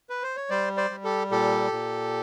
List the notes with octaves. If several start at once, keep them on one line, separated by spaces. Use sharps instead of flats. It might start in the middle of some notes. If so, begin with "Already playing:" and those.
B4
C5
C#5
G3 C5 D5
C5 D5
G3
G4 A4
A#2 G4 A4
A#2